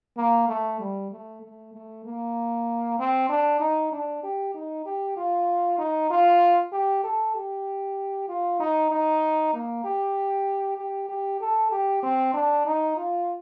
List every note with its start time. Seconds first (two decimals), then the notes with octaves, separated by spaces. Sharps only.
0.17 A#3
0.49 A3
0.80 G3
1.12 A3
1.42 A3
1.73 A3
2.05 A#3
2.99 C4
3.30 D4
3.60 D#4
3.92 D4
4.23 G4
4.55 D#4
4.86 G4
5.17 F4
5.79 D#4
6.10 F4
6.73 G4
7.04 A4
7.35 G4
8.28 F4
8.60 D#4
8.91 D#4
9.53 A#3
9.85 G4
10.78 G4
11.09 G4
11.41 A4
11.72 G4
12.03 C4
12.34 D4
12.66 D#4
12.97 F4